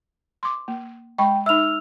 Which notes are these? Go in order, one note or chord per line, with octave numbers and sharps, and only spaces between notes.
C6 D6
A#3
G#3 G5 B5 C#6
D#4 E5 E6 F6 F7